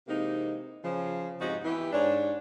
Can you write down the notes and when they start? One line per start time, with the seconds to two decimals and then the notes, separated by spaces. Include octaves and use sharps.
0.08 C3 E3 G#3 A#3 D#4
0.83 C#3 F3
1.40 F2 G#2 D#4 F#4 G4 D#5
1.64 E3 B3 E4 G4
1.92 G#2 D4 C#5